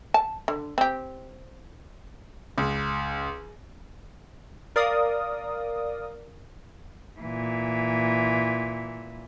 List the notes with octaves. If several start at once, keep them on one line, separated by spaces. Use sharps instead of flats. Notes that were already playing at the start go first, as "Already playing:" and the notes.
A5
D3
C4 G4
C#2
A#4 D5 F5 D#6
A#2 E3